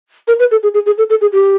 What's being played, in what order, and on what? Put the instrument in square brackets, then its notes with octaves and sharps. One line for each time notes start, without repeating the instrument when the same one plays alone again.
[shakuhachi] A#4
B4
A4
G#4
G#4
G#4
A4
A4
G#4
G4